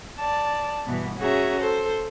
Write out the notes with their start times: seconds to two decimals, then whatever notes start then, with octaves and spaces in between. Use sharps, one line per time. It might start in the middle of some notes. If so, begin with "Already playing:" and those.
0.18 D5 A5
0.86 G2 B2 E3
1.17 C#4 F#4 G#4 E5 A#5
1.60 A4 C5